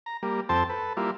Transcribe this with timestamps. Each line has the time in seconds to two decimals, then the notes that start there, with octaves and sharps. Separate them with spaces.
0.06 A#5
0.23 G3 A#3
0.49 F2 C4 A4 C5 G5 A5
0.70 A4 B4
0.97 G3 A#3 E4 F4